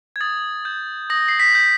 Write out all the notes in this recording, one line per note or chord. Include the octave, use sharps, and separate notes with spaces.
G#6
D#6 A6
G6
D#6 A#6
C7
B6
G6